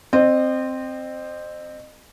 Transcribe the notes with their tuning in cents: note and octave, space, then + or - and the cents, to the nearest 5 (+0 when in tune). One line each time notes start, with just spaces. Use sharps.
C4 +0 D#5 -35